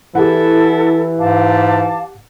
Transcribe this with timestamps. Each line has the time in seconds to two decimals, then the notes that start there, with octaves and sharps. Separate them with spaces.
0.15 E3 E4 G4 A4 F#5
1.19 G#2 F5 A5 D6